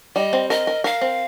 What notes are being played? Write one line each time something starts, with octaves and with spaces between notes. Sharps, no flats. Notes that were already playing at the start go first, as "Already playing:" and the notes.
G3 D#5
C4
A#4 D#5
A#4
A#4 F5
C4